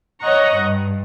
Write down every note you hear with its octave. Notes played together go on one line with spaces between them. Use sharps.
C#5 D#5 F#5 A#5 C#6
G2